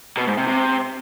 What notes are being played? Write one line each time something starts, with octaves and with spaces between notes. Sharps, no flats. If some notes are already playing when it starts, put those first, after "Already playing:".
B2
G#2
C3
C3